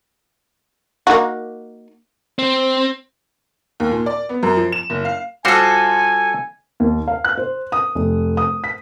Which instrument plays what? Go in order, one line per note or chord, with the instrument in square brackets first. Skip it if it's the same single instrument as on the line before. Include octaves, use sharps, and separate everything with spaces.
[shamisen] A#3 D#4 F#4
[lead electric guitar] C4
[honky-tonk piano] D#2
A#2
D5
B3
F#2
F3
E7
F#1
F5
[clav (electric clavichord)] G3 F#4 C5 [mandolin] F4 A4 [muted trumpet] G#5
[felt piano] D#2
F5
F#6
C5
D#6
F1
D#6
B6